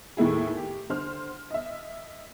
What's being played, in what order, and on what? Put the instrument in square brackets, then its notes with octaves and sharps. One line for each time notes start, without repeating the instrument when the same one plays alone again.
[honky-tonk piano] D#2 A2 A3 E4 G#4
G4
D3 C5 F6
D#5 E5